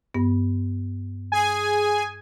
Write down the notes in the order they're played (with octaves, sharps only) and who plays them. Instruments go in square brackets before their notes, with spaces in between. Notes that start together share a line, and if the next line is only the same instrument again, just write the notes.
[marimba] G2 B3
[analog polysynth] G#4 G#5